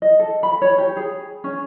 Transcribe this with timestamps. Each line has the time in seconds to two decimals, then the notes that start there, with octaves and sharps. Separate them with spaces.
0.02 D#5
0.19 A4
0.43 B5
0.62 C#5
0.78 G4
0.97 G#4
1.44 C#4